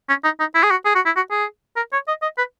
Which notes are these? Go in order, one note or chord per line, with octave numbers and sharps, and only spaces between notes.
C#4
D#4
D#4
E4
G#4
F#4
G#4
F#4
E4
F#4
G#4
A#4
C#5
D#5
D#5
B4